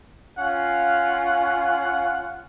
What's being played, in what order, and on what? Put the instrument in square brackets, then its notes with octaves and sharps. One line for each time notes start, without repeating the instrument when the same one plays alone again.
[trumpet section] C#4 F4 F5 F#5